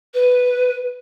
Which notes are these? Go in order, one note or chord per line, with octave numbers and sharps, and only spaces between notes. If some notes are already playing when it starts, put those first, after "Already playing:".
B4